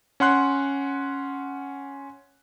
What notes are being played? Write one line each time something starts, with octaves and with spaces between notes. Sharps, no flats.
C#4 F#5 C6 F#6